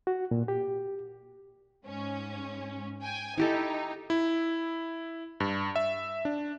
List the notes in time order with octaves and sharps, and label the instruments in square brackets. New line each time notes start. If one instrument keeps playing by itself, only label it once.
[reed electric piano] F#4
A#2
G4
[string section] G#2 C#4
G5 G#5
[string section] D#4 [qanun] E4 G4 A4
[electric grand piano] E4
G2
E5
D4